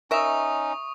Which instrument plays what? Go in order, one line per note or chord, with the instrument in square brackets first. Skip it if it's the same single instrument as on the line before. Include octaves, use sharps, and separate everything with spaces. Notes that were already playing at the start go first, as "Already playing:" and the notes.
[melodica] C#4 D#4 [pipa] A#4 E5 [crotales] C#6 D#6